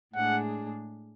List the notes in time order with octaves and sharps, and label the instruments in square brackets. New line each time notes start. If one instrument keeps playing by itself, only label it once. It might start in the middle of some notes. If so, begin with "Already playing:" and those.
[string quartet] A2 G#3 D4 G#4 [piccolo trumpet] F#5